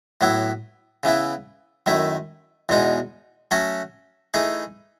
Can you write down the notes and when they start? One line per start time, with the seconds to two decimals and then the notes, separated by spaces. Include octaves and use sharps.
0.21 A2 F#3 B3 E4
1.03 C#3 E3 B3 E4
1.86 F#2 D#3 A3 E4
2.69 E2 B2 G#3 D#4
3.51 F#3 A3 C#4 F#4 A4
4.34 E3 A3 D#4 G#4